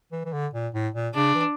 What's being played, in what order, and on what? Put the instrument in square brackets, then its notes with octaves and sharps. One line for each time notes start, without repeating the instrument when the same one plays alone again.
[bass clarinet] E3
E3
D3
A#2
A2
A#2
[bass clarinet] C#3 [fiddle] D4
[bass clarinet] E3